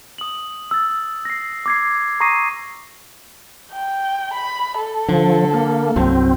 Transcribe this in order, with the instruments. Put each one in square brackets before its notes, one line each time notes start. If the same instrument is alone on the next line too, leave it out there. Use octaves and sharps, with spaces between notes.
[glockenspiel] D#6 F#7
E6 A6
A#6 C7
D6 G#6 C7
A#5 C#6 D#6 A#6 C7 D#7
[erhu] G5
B5
A4
[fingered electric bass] D3 [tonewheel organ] F3
[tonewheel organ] A#3
[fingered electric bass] C2 G2 F#3 [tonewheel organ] C4